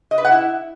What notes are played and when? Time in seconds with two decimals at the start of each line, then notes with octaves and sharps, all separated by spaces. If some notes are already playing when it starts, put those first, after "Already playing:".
0.11 D#5
0.18 B4
0.25 F#5
0.31 E4